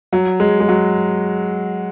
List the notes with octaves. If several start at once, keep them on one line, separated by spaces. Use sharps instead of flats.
F#3
G#3
G#3
F#3